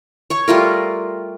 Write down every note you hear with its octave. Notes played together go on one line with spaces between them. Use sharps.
C#5 C#6
G3 A3 F4 A#4